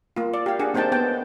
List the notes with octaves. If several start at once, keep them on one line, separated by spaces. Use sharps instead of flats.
A#3 F4
D5
G4 F5
D4 G#4 F#5
A#3 C4 D#4 G5 A5
B3 G5 A5